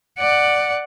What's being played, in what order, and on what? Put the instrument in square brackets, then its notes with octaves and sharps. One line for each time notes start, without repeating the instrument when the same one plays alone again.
[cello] D5 F#5